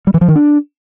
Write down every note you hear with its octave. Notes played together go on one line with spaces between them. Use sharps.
G3
E3
F3
D#3
D4